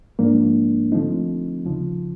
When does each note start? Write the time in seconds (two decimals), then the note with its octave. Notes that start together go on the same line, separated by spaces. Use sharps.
0.19 G#2 F3 A#3 D4
0.92 D3 F3 A3 C4 D#4
1.65 D#2 C#3 F3